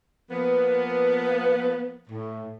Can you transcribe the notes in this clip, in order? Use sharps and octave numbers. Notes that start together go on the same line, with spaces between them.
F3 A#3 B3
A2